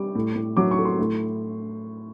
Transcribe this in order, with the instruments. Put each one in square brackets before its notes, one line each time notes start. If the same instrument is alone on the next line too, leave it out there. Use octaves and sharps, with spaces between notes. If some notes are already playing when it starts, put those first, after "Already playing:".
Already playing: [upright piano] G3 D6
A2
A2
F#3 D6
C#6
A3
C6
A2